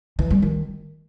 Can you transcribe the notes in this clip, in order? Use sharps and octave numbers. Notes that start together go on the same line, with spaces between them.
E3
G3
D#3